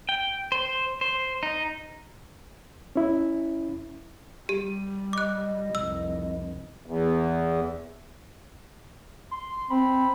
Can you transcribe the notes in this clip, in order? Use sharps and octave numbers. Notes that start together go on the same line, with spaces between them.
G5
C5
C5
D#4
C#4 E4
G3 G4
D#5 D6 F#6
F1 C2 E6
E2
C6
C4 B5